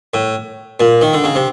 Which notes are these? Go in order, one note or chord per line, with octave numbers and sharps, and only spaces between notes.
A2
A#2
D#3
D3
C#3
C3